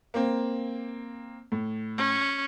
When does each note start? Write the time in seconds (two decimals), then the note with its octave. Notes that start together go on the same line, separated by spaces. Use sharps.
0.14 A#3 C4
1.52 A2
1.98 C#4